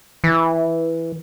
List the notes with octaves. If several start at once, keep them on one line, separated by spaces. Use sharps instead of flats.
E3